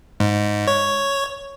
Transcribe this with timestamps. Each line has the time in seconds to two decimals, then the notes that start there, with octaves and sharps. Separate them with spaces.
0.20 G#2
0.67 C#5